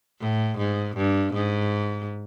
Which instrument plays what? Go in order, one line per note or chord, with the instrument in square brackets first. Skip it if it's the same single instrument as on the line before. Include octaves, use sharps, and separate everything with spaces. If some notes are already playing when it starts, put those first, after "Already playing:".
[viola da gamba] A2
G#2
G2
G#2